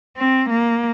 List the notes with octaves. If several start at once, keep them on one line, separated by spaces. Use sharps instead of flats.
C4
A#3